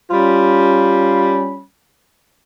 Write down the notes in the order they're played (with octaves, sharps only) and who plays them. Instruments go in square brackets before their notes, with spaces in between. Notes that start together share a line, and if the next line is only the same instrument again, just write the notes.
[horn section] G3 C#4 F4 B5